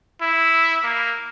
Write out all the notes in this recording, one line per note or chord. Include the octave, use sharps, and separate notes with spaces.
E4
A#3